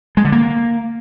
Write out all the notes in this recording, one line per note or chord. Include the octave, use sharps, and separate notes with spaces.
G#3
D3
A#3